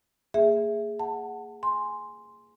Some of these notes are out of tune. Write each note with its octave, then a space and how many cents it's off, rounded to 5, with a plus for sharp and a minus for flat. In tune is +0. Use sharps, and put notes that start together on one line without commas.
A#3 -30 G#4 +0 E5 +0
F#5 +0 A5 +15
G#5 +0 C6 +0